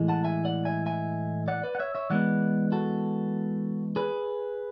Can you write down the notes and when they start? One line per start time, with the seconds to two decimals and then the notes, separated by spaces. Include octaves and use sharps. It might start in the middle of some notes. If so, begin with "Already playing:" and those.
Already playing: A2 E3 G#3
0.08 F#5 A5
0.24 E5 G#5
0.45 D5 F#5
0.65 E5 G#5
0.86 E5 G#5
1.48 D5 F#5
1.63 B4 D5
1.75 F#5
1.79 C#5 E5
1.95 C#5 E5
2.10 E3 G#3 B3 D5 F#5
2.72 F#4 A4
3.96 G#4 B4